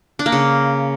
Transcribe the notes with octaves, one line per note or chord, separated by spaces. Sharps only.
D4
A#3
C#3